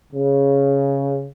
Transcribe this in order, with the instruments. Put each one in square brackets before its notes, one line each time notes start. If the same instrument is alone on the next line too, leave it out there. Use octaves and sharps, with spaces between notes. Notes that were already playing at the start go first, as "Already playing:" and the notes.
[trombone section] C#3